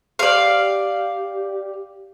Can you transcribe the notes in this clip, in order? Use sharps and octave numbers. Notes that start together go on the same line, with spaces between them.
G4 D5 F5